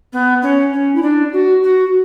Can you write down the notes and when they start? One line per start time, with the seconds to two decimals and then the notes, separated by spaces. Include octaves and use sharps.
0.12 B3
0.42 C#4
0.73 C#4
0.95 E4
1.02 D4
1.32 F#4
1.63 F#4